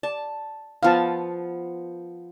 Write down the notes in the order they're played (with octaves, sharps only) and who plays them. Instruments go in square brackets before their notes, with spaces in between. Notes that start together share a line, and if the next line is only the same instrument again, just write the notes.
[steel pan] D5 [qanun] A5
[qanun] F3 B3 [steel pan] F5 A5